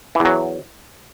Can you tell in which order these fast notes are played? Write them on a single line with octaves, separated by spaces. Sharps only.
E3 E2 F#3